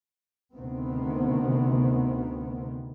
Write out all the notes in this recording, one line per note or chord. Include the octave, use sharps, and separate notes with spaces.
D2 C3 D#3 B3 C4